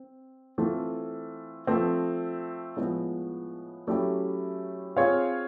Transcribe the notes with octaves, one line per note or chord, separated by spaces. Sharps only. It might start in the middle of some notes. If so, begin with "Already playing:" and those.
Already playing: C4
E3 A3 C4 F4 A4
F3 A3 C4
A2 F3 G#3 B3
F#3 A3 C#4 E4 G4
C4 F4 G#4 C#5 F5